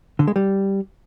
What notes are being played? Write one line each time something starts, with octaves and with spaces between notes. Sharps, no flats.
D3
G#3
G3